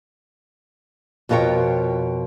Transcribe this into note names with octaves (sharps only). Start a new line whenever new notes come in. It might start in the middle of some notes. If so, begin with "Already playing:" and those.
F2 B2 F4 A#4 C#5 G5